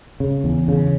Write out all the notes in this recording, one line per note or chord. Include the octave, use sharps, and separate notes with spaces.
C#3
E2
C#3